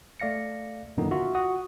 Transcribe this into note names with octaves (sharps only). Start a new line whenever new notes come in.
A3 D5 F5 A#6 C#7
F#2 A#2 D3 D#3 B3 D#4
F4 F#4 E5
F#4 F#5 D#6